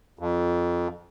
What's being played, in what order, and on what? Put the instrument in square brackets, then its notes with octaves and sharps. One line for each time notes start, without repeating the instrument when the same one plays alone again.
[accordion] F2